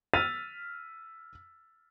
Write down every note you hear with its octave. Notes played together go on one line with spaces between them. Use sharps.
E6 F6 A6 B6 D#7 F7